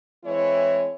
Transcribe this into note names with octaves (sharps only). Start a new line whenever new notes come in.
E3 G#3 C4 E4 C#5